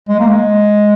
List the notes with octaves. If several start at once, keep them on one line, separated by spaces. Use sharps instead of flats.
G#3
A#3
G#3